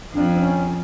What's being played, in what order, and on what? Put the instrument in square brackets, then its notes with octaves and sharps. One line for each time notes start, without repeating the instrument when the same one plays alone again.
[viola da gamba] F2 [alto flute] D4
[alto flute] C4
C#4